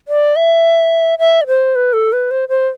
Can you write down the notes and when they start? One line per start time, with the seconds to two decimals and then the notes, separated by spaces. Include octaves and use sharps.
0.08 D5
0.36 E5
1.19 E5
1.41 D5
1.47 C5
1.75 B4
1.93 A4
2.12 B4
2.31 C5
2.49 C5